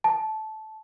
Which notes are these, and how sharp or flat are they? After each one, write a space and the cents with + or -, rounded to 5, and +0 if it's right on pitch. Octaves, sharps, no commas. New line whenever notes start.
A5 -15